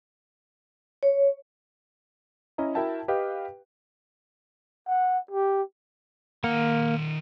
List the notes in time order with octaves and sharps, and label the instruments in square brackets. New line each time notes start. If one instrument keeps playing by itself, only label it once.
[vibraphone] C#5
[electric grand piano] C#4 E4 D#5 A#5
E4 F#4 A#4 E5 G5 A5
G4 B4 D#5 F5 G5
[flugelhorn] F#5
G4
[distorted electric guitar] D#3 F#5 [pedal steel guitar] A#3